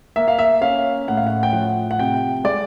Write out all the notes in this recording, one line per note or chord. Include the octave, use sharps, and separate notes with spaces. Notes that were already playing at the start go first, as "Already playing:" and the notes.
A#3 E5
F5
E5
C#4 F5
A2 F#5
F5
F#5
G5
F3 F#5
F#5
C3 G5
G#3 D5